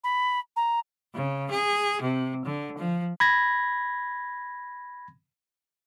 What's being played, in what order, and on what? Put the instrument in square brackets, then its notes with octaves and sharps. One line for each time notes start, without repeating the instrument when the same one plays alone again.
[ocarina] B5
A#5
[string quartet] C#3
G#4
C3
D3
F3
[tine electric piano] B5 G#6 A#6